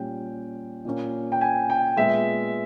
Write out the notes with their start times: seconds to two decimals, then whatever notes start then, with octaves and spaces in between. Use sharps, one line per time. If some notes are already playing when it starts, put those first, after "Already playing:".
Already playing: A#2 G3 C#4 G5
0.85 A#2 A#3 C#4
1.32 G5
1.41 G#5
1.70 G5
1.97 A#2 G#3 B3 E5